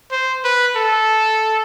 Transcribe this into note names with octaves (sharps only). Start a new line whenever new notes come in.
C5
B4
A4